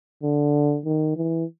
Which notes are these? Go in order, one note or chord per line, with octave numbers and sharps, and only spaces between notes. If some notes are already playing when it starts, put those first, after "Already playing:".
D3
D#3
E3